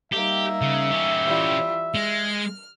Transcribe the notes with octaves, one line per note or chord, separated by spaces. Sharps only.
G3 A#3 D#4 G4 E5
C#3
C#4 G4
E3 G3 F4
G#3 F6